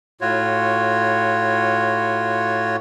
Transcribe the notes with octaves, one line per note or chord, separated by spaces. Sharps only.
A2 F4 F#4 C#5